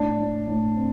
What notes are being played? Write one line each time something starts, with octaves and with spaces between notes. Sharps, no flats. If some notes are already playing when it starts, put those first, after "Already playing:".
Already playing: A2 D4
A2
A2
C4